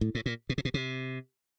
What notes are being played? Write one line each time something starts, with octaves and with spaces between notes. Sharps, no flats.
A2
A2
A#2
B2
C3
B2
C3